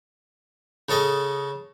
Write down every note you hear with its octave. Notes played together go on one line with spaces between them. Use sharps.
C#3 C#4 A4 D#5